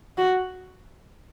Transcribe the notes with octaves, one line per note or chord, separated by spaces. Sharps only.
F#4